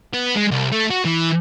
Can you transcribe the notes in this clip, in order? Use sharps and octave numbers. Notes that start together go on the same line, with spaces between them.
B3
G#3
C2
A3
F#4
E3